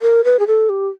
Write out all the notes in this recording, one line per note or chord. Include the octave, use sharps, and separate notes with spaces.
A#4
B4
G#4
A4
G4